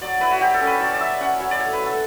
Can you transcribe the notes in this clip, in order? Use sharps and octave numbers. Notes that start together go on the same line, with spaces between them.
F#3 D5
E4 B4
F#4
F#3 G4
A4
C#4
B4
F#3 D5
D5
E4 E5
C#4 F#5
F#3 C#5
D5
A2 C#5
B4
F#3
A4